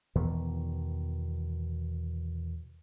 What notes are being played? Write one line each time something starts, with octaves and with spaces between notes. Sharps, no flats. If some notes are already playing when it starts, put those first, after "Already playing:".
E2 B2 D#3 E3